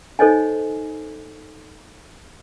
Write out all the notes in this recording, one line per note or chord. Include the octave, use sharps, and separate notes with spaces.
D#4 A4 C5 C#5 D#5 G#5